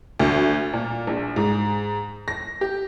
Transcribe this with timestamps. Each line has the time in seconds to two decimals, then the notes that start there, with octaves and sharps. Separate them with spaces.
0.20 D2
0.73 A#2
1.07 A#1
1.36 G#2
2.28 A#6
2.61 G4